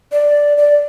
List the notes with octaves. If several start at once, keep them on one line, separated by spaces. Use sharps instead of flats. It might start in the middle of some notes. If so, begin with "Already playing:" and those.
D5
D5